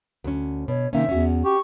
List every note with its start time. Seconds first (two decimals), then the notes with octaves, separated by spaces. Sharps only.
0.24 D2 C#4
0.68 B2 C#5
0.93 C3 D#3 A#3 C#4 E5
1.09 E2 C#4 F#4
1.45 G4 C#6